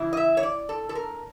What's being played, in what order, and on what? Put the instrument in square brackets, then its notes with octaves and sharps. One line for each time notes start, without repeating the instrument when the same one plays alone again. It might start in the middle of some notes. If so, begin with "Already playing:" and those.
Already playing: [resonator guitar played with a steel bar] C#3 E3 E4
D#5
E5
C#5
D5
A4
A4
A#4